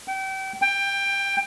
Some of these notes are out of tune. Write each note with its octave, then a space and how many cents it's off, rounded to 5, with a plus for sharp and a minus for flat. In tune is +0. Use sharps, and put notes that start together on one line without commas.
G5 -35
G5 +20